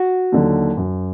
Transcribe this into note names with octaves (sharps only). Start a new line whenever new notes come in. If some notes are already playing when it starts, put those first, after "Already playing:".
Already playing: F#4
D#2 D3 F#3
F#2